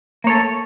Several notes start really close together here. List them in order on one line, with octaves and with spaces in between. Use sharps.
A#3 C#5 A4